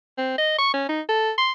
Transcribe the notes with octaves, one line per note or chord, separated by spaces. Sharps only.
C4
D#5
C#6
C#4
D#4
A4
C6